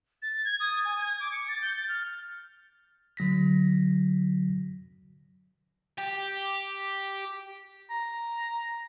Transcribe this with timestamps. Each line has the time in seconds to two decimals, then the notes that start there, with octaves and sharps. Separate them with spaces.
0.22 A6
0.45 G#6
0.60 D#6
0.85 G#5
0.99 G#6
1.20 D6
1.32 C#7
1.48 A6
1.62 G6
1.77 A6
1.89 F6
3.17 D3 F#3 A#6 B6
5.98 G4
7.90 A#5